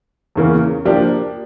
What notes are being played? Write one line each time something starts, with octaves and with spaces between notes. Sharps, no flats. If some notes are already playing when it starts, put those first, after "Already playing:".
E2 C#3 E3 A#3
F3 A#3 D4 G4